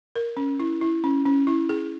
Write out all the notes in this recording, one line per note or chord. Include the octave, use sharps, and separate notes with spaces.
A#4
C#4
E4
E4
C#4
C#4
E4
G#4